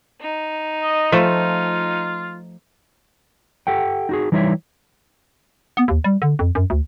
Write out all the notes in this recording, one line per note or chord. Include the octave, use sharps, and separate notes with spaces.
D#4
D#5
F3 A3 F4
G4 A4 F#5 G5
D#4 F#4 G#4
E3 G3 D#4 E4 C#5 E5
B3
D#2
G3
D3
F2
F#2
D2